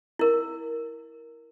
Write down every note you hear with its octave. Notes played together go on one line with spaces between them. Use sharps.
E4 A#4